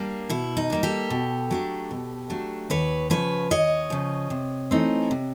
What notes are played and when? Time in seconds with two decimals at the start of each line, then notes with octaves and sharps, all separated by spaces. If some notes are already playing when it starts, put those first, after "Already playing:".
Already playing: G3 A#3 D4
0.29 B2 E4
0.57 D#4
0.70 D4
0.72 G3 A#3
0.83 G4 A4
1.10 B2
1.51 F#3 A3 D4
1.91 B2
2.30 F#3 A3 D4
2.70 D#2 B4 C#5
3.10 C#3 F3 B4 C#5
3.50 D#2 C#5 D#5
3.90 C#3 F3
4.30 C3
4.71 E3 A3 C4 D#4
5.11 C3